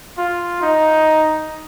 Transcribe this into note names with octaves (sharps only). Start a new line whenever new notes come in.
F4
D#4